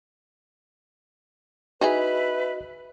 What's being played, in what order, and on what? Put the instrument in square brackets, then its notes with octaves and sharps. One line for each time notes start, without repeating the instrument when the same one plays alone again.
[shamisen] D#4 E4 G#4 [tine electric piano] F#4 D#5 [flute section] B4 E5 B5